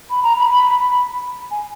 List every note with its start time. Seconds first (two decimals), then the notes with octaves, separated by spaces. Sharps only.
0.10 B5
0.23 A#5
0.36 B5
1.51 G#5